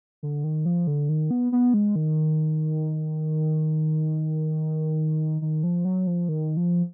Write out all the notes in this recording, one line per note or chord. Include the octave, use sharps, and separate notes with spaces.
D3
D#3
F3
D3
D#3
B3
B3
G#3
D#3
D#3
F3
F#3
F3
D#3
F3